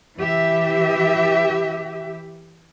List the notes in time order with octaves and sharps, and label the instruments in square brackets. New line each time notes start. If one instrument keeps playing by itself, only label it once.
[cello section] E3 G4 E5